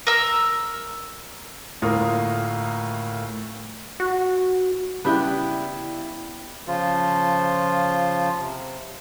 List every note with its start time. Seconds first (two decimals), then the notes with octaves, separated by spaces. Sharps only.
0.07 A#4 E6
1.82 D2 A2 A#3 F4 A#4 D#6
4.00 F#4
5.05 C#3 G3 B3 D4 E4 G4
6.67 C#3 F3 F4
8.39 C3